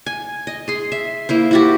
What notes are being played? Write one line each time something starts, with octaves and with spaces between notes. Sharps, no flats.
G#5
D#5
G#4 C6
E5
A#3 E4 C5
E4 F#4 G4